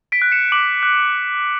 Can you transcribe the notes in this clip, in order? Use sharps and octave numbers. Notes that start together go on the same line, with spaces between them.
B6 D7
F#6
C#7 E7
D6 D7 F#7
F#6